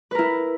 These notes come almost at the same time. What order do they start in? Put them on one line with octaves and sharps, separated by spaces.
B4 A#4 E4